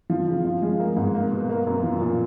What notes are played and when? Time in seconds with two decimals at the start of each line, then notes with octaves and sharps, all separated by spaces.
0.10 F3
0.27 C#3
0.45 F3
0.62 G#3
0.79 A#3
0.96 G#2
1.15 A#3
1.31 B2
1.49 A#3
1.67 F#2
1.83 F3
2.01 A#2